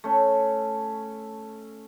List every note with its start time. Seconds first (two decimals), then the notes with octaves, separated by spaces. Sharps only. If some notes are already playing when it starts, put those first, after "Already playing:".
0.04 A3 C#4